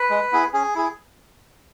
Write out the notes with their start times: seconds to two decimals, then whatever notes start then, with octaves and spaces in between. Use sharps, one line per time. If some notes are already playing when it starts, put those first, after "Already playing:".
Already playing: B4
0.10 G#3
0.32 B3 E4 G#4
0.53 C#4 G#4
0.75 E4 G#4